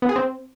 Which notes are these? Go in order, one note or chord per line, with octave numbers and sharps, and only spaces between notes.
B3
G#4
C4